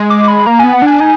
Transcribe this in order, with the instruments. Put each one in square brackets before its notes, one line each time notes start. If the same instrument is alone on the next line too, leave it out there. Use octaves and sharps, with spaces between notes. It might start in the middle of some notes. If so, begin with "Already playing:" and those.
Already playing: [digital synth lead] G#3
[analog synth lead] D6
B5
[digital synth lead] A#3 [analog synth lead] A#5
[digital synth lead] B3 [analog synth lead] G#5
[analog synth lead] F#5
[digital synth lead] D4 [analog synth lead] G#5
[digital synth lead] D#4 [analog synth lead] G#5